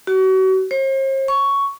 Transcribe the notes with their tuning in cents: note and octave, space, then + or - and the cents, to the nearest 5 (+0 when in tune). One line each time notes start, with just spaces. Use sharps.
F#4 +35
C5 +45
C#6 +10